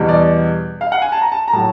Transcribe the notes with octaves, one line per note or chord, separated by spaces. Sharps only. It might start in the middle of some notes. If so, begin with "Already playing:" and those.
Already playing: E2 B2 G3
D5
F5
F#5
G#5
A5
A#5
A5
A#5
A2 F#3 A5